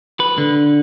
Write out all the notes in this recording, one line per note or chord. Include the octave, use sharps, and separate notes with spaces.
B4
D3